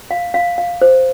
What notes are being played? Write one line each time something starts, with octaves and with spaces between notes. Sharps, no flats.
F5
F5
F5
C5